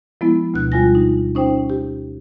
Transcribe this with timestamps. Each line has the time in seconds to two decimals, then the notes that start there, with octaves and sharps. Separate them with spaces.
0.21 F3 G#3 B3 E4
0.54 D2 B2 F#6
0.72 G3 F4 G#5 A#6
0.95 D#4
1.35 C#4 D#4 C5 G5
1.70 G4